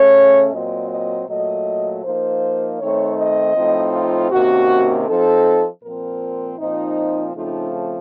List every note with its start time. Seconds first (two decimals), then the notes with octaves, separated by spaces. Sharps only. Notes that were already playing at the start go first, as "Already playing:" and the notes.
Already playing: C#3 A3 C#4 C#5
0.52 A#2 F#3 C4 D#5
0.90 D#5
1.28 A#2 F#3 A3 D#5
2.04 F3 A#3 D#4 C5
2.80 D#3 A3 C4 D#4 C#5
3.18 D#5
3.56 A2 F3 C4 D#4
3.94 F4
4.32 C3 D#3 A#3 C#4 F#4
5.07 F3 C4 D#4 A4
5.83 A#2 F3 C4 A#4
6.59 A#2 F3 C4 D#4
7.35 C#3 F3 A3 C4 D#4 F4